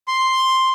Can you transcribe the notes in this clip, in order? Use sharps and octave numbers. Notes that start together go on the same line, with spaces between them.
C6